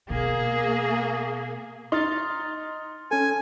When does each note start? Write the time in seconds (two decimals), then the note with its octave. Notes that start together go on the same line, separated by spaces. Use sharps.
0.10 B2 A#3 G#4
1.92 D#4 C6 F6 A6
3.11 C#4 A4 G#5